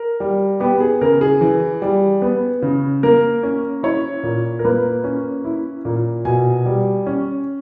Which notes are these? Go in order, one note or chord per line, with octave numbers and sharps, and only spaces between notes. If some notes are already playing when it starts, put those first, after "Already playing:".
Already playing: A#4
G3
B3 G4
G#4
C#3 A#4
G#4
E3
G3
B3
C#3
A#3 A#4
C#4
E4 C#5
A#2
A#4
A#3 B4
C#4
E4
A#2
B2 G#5
G3
C#4